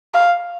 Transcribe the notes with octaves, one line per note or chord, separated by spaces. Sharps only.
F5